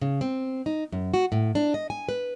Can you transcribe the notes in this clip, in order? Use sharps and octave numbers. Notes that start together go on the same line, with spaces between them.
C#3
C4
D#4
F#2
F#4
A2
D4
D#5
G#5
B4